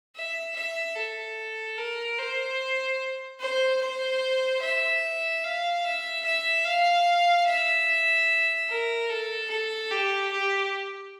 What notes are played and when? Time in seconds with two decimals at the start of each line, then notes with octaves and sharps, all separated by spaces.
0.15 E5
0.56 E5
0.96 A4
1.78 A#4
2.18 C5
3.40 C5
3.81 C5
4.62 E5
5.44 F5
5.85 E5
6.24 E5
6.65 F5
7.47 E5
8.69 A#4
9.09 A4
9.50 A4
9.91 G4
10.31 G4